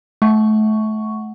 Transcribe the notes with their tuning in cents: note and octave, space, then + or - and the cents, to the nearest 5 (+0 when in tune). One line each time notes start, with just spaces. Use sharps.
A3 -30 F#5 +0 C#6 +5